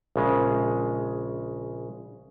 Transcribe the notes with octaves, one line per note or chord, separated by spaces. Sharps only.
A#1 C#3 G#3